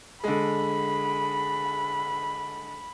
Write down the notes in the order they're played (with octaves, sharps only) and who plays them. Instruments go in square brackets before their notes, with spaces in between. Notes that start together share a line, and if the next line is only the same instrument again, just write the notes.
[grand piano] D3 G#3 [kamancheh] B5